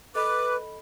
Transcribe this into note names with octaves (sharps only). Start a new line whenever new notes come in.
A4 B4 D#5 B5 D6